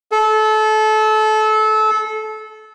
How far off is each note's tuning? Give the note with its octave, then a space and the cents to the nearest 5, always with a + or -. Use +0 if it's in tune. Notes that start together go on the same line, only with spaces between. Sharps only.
A4 -25